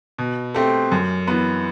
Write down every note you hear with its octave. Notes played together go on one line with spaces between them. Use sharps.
B2
A3 C4 G4
F#2
E3 B3